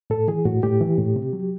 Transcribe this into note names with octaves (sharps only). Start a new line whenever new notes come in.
A2 A4
E3 G#4
A2 F#4
A2 G4
E3
A2
C3
F#3